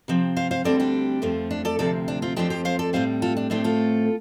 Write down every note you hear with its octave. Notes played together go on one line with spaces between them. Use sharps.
C3 F3 C4
C5 F5
C5 F5
D2 D3 G3 C4 A4 D5
D4 G4
F2 F3 A3 C4
D4
A4 D5
D2 C3 F3 C4 A4 D5
D4
C4 F4
F2 F3 C4 D4 G4
G4 C5
C5 F5
A4 D5
A2 G3 C4 C5 F5
F4 A4
D4
A2 A3 C4 D4 G4
F4 A4